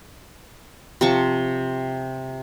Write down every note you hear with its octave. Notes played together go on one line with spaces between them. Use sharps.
C3 F3 A5 C#6